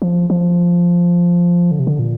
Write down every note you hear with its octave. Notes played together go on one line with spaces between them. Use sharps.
F3
F3
D3
C3
D3
A#2